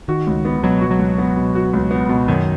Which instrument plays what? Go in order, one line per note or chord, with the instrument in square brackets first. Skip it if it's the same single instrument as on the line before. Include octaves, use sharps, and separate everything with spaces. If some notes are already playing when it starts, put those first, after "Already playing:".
[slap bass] D#3 [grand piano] F#4
[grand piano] C#2
B3
[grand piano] B2 [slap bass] F#3
[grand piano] F#4
[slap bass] F#3
[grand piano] C#2
B3
B2
F#4
C#2
B3
B2
[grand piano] F#2 [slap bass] D#3